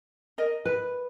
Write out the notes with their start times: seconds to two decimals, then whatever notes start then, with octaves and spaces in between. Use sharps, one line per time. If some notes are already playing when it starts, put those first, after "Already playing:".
0.38 A#4 D#5
0.65 B4